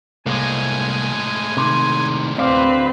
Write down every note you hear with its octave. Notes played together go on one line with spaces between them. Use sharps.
C2 A2 G#3 A#3 G#5
C3 D#3
D2 C4 B4 D5 F5